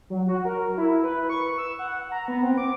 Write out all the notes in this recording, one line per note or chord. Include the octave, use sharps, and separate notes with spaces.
F#3
F#4
A#4
E4
B4
C#6
E6
F#5
A#5
B3
C4
D6